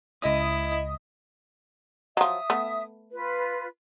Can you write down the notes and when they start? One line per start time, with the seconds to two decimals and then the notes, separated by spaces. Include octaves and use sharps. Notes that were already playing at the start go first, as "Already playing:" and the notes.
0.22 C#2 E4 D#5 D#6
2.17 F3 F#3 E5 D#6
2.50 A3 B3
3.12 F4 B4